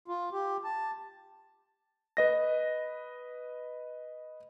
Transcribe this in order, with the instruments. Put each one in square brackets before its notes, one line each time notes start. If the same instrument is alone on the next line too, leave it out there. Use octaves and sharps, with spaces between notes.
[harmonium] F4
G4
A5
[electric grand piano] B4 D#5 A#6